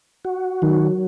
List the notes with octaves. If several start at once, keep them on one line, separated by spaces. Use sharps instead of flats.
F#4
D#3 F#3